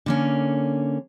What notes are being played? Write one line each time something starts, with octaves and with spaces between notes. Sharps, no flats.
D3 A#3 C#4